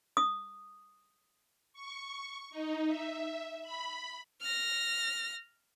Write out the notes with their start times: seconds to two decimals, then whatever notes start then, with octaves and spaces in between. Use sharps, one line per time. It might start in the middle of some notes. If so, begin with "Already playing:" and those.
0.17 D#6
1.73 C#6
2.51 D#4
2.86 E5
3.62 B5
4.42 F6 A#6